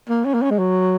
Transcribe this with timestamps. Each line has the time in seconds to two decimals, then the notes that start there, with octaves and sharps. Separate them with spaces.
0.09 A#3
0.25 C#4
0.34 A#3
0.42 C#4
0.51 G#3
0.59 F#3